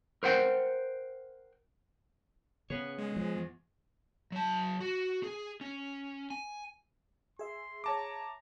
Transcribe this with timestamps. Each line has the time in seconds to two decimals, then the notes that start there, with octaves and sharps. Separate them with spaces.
0.23 A#4 C5 F#5 G5
2.70 C#3 B3 G#4 C#5
2.98 G#3
3.16 F3
3.36 E2
4.32 F#3 A5
4.80 F#4
5.23 G#4
5.61 C#4
6.30 G#5
7.39 G#4 E5 C6
7.84 C#5 A5 A#5 D6